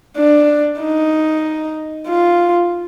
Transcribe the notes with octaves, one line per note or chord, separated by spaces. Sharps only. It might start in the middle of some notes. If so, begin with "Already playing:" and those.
D4
D#4
F4